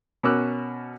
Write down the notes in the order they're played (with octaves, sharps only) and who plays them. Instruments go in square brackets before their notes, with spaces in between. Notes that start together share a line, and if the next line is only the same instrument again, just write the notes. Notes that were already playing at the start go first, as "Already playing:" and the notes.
[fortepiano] B2 C#4 A#4 D6 E6 F#6